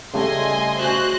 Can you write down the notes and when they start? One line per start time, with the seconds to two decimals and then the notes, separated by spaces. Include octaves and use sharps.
0.14 C#3 G3 A3 D#5 G#5 C6
0.79 F#4 C5 F#6